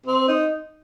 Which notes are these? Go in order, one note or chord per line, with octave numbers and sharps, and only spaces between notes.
C4
D#4